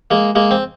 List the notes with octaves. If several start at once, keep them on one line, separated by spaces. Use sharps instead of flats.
G#3 A#3
G#3 A#3
C4